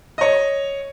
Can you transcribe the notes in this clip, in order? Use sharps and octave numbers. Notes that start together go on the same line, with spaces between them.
C#5 D#5